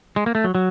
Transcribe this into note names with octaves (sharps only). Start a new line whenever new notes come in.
G#3
A#3
A3
F#3
F#3